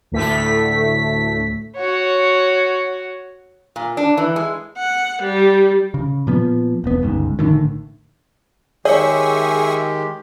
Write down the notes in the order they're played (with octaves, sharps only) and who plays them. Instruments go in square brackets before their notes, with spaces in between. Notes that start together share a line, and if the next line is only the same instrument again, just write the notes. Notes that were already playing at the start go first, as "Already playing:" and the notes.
[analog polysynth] D2 A2 A3 B6
[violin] F#4 C#5
[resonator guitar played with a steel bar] A#2
D4
E3
G#3
[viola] F#5
G3
[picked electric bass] C#3
A#2 F3 B3
E1 B3
G1 C#2 G#2
A#1 A2 D3 D#3
[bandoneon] D#3 G#3 G4 [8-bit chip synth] G#4 E5 C#6 [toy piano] C#5